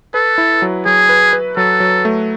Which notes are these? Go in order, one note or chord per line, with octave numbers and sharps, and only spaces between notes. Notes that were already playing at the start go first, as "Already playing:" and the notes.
A4 B4
E4
F#3
F#3 G#4
B4
B4
F#3 A4
F#3
A3